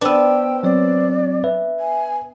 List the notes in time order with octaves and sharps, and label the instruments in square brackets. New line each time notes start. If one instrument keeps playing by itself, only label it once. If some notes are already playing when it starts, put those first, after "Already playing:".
[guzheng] B3 D4 [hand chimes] B4 C5 E6 [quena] G5
[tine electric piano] F#3 C4 C#5 [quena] D5
[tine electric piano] B4 [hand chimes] E5
[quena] G#5